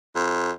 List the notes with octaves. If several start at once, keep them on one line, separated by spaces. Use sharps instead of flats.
F2